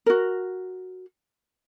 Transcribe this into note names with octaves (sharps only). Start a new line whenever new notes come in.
F#4 A#4